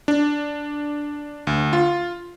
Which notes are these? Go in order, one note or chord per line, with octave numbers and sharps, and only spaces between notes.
D4
D2
F4